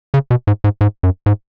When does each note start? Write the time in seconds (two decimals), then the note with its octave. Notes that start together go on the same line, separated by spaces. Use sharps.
0.14 C#3
0.31 B2
0.47 G#2
0.64 G#2
0.81 G#2
1.03 F#2
1.26 G#2